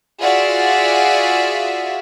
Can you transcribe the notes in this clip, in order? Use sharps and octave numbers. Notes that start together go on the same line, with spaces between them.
F4 F#4 G#4 D5 E5 F5